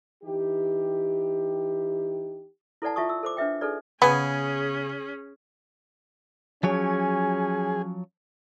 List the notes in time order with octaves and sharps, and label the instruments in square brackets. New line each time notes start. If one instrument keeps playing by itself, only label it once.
[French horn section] E3 D#4 G4
[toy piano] E4 A4 B4 D5 F#5 A5
F4 E5 A5 C#6 D#6
E6
A4 C5 D6
D4 B4 E5 G5
D#4 G#4 A4 B4 D5
[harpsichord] C#3 G#5 [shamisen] B3 [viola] C#4 G#4
[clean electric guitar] F3 F#3 C#5 [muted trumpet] C#4 [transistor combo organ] G#4